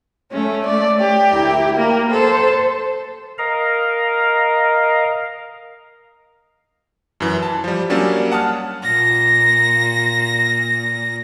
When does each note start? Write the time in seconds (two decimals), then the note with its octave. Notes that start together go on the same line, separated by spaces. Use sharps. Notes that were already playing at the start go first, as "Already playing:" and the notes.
0.32 A3 C#4
0.66 D5
1.00 G4
1.31 D2 E4 A#4
1.77 A#3 A#4
2.11 A4 C5
3.38 A#4 D#5 F5 A#5
7.20 F#2 E3
7.43 A5
7.64 F3 G3
7.90 F#3 G3 A#3 C#4 D4
8.32 F#5 A5 D#6 F6
8.81 A#2 A#6